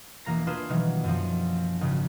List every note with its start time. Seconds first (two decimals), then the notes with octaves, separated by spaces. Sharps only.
0.25 E1 E3 A#3 A#5 A#6
0.47 A#3 D4 F4 G#4 B4 E7
0.69 B2 D#3 E3 F#3 G3
1.04 F#2 F3
1.81 G#1 C#3 G3